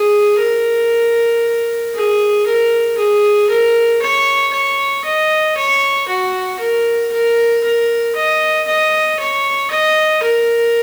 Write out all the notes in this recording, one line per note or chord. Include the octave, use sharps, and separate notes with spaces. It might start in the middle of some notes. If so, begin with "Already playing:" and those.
Already playing: G#4
A#4
G#4
A#4
G#4
A#4
C#5
C#5
D#5
C#5
F#4
A#4
A#4
A#4
D#5
D#5
C#5
D#5
A#4